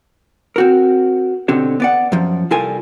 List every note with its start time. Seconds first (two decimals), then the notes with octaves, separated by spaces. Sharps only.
0.56 C4 F#4 A#4
1.48 B2 D3 C4 G4 C#5
1.80 B3 D5 F#5
2.12 F#2 F3
2.51 C2 G3 F4 A4 A#4 G#5